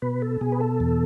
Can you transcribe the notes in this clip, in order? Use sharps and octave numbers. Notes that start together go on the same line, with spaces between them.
B2 B4
A4
B2 G#4
B4
A4
E2